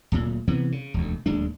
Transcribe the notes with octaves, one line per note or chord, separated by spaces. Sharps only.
D1 A#2
C3 E3 B3
C#3
E1 D2
D1 D#2 G#3 D4